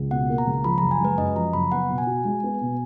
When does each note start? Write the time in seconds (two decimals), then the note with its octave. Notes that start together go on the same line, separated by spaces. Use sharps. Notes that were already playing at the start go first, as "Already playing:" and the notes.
Already playing: C#2
0.11 B2 F#5
0.29 A#3
0.38 A#5
0.47 C#2
0.64 F3 B5
0.78 F#1 A#5
0.91 G#5
1.01 G#3 B4
1.18 F#2 D#5
1.36 F3 A#5
1.53 F#1 B5
1.72 B3 F#5
1.90 B2
1.98 G#5
2.07 F#4
2.25 G#3
2.44 B3
2.61 B2